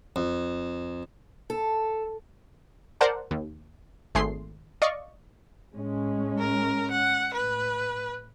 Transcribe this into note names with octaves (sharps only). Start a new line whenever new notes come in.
F2
A4
A#4 C5 D5 F#5 A5
D#2
G#1 A3 G#4 C6 C7
D5 D#5 F5 C#6
A2 G#3 C#4
A#4
F#5
A2 B4